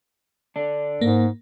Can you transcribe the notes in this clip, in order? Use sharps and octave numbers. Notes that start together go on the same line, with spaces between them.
D3 D4
G#2 A#3